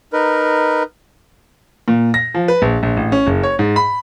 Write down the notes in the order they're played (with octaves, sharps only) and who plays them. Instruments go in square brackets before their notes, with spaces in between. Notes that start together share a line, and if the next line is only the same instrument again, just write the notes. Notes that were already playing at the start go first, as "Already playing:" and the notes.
[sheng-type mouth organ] D#4 A#4 B4
[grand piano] A#2
A#6
F3
B4
A#1
A#1
A1
C#4
F#1
C#5
G#2
B5